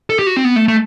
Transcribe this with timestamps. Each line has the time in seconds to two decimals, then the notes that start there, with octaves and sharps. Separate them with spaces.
0.10 A4
0.19 G4
0.27 F#4
0.36 C4
0.45 B3
0.56 A3
0.68 A3